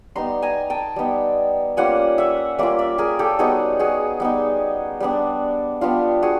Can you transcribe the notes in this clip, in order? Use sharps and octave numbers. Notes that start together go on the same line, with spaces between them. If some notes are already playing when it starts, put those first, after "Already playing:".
G3 B3 D#4 A#5 C6
G#5 A#5
G5 A5
G3 B3 D#4
G3 A#3 C#4 F4 F#5 G#5
E5 F#5
G3 A#3 C#4 F4 D5 E5
D5 E5
G#4 A#4
G4 A4
G3 B3 D#4 F#4 G#4
F#4 G#4
G3 B3 D#4
G3 B3 D4
G3 B3 D4 F4 G4
F#4 G#4